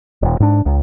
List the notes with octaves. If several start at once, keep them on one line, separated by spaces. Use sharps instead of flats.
D#1
G#2 D4
C#2